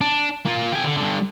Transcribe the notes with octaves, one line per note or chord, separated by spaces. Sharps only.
D4
A#3 F4
G4 G#5
D3
G2 D3